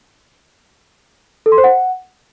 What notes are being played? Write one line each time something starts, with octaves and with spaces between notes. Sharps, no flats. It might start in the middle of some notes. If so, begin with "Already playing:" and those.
A4
C6
C5
F#5